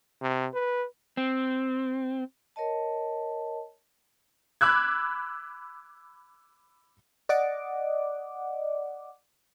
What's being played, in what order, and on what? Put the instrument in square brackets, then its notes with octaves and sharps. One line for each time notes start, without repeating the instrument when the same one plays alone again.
[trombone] C3
B4
[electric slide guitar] C4
[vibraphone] A#4 C#5 D#5 A5
[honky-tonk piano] B5 D6 E6 F#6 G#6
[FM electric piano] D5 D#5 F#5 D6